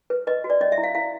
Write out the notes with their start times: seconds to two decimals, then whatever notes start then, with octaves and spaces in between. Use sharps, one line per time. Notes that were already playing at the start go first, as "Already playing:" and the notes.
0.10 B4
0.27 B4 D#5
0.44 F#4
0.50 D5
0.61 C#4 D#5
0.72 E5
0.78 E4
0.83 F5
0.95 E4 F5